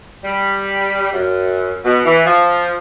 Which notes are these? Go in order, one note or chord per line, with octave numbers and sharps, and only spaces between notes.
G3
F#2
B2
E3
F3